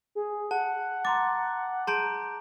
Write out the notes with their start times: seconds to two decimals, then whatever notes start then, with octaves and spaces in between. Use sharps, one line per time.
0.15 G#4
0.51 F#5 A5
1.05 A#5 C6 D6 A6
1.87 G#4 A5 A#5 C6 G6 D7